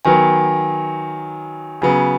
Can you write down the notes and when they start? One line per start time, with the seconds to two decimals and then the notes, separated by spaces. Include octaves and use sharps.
0.05 D#3 F#3 B3 G#5
1.82 C#3 F#3 B3 G#5